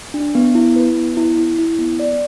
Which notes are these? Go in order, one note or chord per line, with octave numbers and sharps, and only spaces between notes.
D4
B3
E4
B4
B3
E4
E4
E4
B3
D5